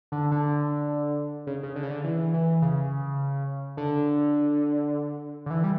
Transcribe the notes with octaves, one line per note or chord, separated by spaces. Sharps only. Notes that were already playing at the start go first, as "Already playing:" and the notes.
D3
D3
C#3
C#3
D3
C#3
D3
E3
E3
C#3
D3
D3
E3
G3